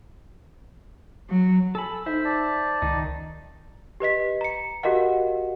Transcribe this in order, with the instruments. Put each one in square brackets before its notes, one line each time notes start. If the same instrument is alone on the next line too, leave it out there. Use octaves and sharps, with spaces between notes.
[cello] F#3
[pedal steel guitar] A4 B5 [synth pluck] G#5 [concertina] E6
[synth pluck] D#4 [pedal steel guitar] C5 E5
[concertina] D5 A5
[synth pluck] C#2 [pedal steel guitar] D#3 D#4
[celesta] G4 B4 D#5 B6
A#5 C#7
F#4 G4 A#4 D#5 F5 F#5